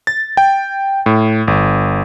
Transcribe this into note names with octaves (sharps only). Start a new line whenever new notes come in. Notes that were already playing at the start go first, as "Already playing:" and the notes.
A6
G5
A2
G1